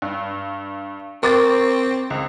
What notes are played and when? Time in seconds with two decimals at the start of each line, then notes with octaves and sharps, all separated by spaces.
0.02 G2
1.23 C4 A#4 C#6 D6 A6
2.10 C#2